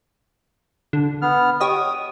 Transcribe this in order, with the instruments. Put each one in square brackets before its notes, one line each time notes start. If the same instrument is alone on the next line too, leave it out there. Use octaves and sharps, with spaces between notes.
[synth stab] D3
[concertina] B3 F6
[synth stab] G4 C#5 D#5 [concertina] D#6